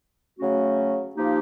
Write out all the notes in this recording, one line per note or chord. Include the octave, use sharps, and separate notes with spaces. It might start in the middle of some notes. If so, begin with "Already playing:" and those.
C#3 F#3 A3 C#4 F#4
F3 A#3 D#4 G4